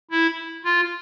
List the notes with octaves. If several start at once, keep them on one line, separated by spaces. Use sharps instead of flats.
E4
F4